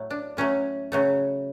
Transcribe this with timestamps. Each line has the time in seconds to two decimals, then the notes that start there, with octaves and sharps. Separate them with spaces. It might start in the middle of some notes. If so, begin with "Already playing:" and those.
Already playing: A2 F#3 A3
0.10 D4
0.37 A2 F#3 A3 C#4
0.92 C#3 F#3 A3